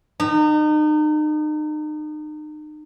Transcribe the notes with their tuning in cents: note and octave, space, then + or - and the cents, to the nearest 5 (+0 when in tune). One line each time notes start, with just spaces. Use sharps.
D#4 -35